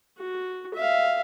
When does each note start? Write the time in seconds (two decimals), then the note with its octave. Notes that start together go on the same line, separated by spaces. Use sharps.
0.18 F#4
0.74 E5 F5